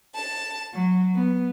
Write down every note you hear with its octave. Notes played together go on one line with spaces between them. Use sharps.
A5
F#3
B3